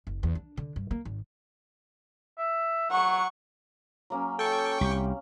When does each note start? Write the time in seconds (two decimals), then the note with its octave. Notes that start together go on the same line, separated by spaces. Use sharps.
0.07 F#1
0.23 E2
0.35 D4
0.57 D3
0.76 G2
0.91 A#3
1.05 G#1
2.38 E5
2.90 F#3 F#5 C#6
4.10 F#3 A#3 C#4
4.39 A4 G5 C#6
4.81 C2 G4